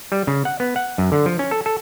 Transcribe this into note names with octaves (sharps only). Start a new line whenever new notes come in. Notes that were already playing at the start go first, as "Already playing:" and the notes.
G3
C#3
F#5
B3
F#5
F#2
D3
F3
C#4
A4
A4